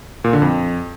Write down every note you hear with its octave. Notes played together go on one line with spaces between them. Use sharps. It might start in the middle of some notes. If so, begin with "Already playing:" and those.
A#2
D3
F2